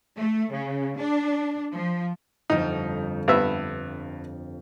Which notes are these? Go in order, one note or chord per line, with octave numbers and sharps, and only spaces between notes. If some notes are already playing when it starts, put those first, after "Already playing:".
A3
C#3
D4
F3
G1 F2 D#4
G2 B3 E5